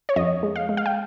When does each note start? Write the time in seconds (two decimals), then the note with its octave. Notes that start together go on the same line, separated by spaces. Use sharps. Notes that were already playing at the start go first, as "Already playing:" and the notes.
0.09 C#5
0.16 F2 D#5
0.43 G#3
0.56 F5
0.69 G#3
0.77 F5
0.86 G5